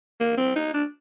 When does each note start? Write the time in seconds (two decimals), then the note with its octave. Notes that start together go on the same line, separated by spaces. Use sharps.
0.20 A#3
0.38 C4
0.56 D#4
0.74 D4